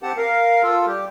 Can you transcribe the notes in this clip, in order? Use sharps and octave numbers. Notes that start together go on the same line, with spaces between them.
C4 G4 F#5 A5
A#4 F5
F4 A4
G3 G4